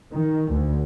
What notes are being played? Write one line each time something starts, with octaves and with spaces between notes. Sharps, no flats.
D#3
D2